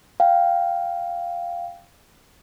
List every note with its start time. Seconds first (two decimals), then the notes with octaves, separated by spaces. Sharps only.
0.20 F5 G5